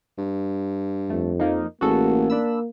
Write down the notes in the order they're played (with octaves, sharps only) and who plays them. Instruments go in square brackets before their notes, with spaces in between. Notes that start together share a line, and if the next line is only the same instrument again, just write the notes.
[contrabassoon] G2
[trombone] F2 [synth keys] A3
[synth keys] F3 A#3 D#4
[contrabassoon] A1 [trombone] A#3 [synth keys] F#4 G#4 A4
[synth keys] D4 B5 E6